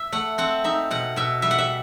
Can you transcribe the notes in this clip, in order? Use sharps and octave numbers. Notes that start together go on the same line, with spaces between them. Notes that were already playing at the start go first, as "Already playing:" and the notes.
Already playing: E5
A3 F#5
C4 F#5
D#4 E5
B2 F#5
B2 E5
G3 E5
F#5
E5